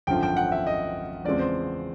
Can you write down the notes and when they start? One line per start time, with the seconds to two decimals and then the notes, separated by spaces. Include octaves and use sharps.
0.07 G#1 F#2 D3 F3 G5
0.23 G5
0.37 F#5
0.52 E5
0.67 D#5
1.25 E2 C#3 F3 G#3 C4 D5
1.39 C5